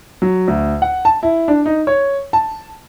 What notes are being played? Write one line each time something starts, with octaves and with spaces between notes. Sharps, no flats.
F#3
D2
F#5
A5
E4
D4
D#4
C#5
A5